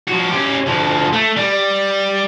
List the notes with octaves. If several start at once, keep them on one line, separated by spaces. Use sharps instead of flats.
F3 F#4
C#4 G4
D2 F3
A3
G3